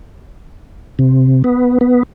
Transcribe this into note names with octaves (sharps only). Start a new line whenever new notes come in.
C3
B3
B3